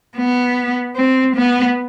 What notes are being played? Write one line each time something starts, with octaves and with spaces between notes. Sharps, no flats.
B3
C4
B3